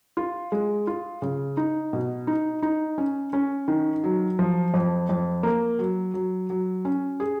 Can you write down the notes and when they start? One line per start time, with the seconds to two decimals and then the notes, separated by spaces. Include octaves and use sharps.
0.17 F4
0.52 G#3
0.87 F4
1.22 C#3
1.57 D#4
1.93 B2
2.27 D#4
2.62 D#4
2.98 C#4
3.33 C#4
3.68 D#3
4.04 F#3
4.39 F3
4.74 F2
5.09 F2
5.43 A#3
5.79 F#3
6.14 F#3
6.50 F#3
6.85 C#4
7.20 G#4